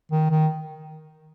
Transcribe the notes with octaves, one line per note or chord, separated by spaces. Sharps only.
D#3
D#3